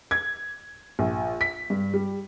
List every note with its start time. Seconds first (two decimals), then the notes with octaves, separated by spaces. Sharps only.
0.11 G#6
0.99 A#1
1.41 B6
1.70 G2
1.94 G3